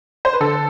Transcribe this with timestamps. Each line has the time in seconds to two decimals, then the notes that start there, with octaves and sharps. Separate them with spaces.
0.25 C5
0.33 B4
0.40 D3 A4